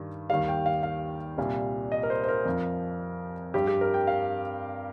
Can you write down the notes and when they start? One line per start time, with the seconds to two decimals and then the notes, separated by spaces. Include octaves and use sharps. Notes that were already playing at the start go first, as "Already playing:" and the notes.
Already playing: G2 D#3 G3
0.30 D#2 D#3 G3 F5
0.48 G5
0.66 F5
0.83 F5
1.38 C2 A#2 G3
1.92 D#5
2.03 A#4
2.10 C5
2.24 C5
2.28 A#4
2.45 F2 F3
3.54 G2 G3 G4
3.67 G4
3.81 A#4
3.94 G5
4.07 F5